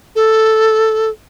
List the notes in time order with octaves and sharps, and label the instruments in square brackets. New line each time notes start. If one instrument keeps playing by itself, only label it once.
[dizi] A4